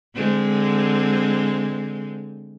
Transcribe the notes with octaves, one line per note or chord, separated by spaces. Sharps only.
D3 G#3 C4